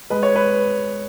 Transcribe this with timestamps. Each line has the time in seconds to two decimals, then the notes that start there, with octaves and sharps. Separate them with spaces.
0.10 G#3 B4
0.23 C#5
0.36 B4